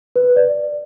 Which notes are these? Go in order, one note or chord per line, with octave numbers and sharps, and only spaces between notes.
B4
D5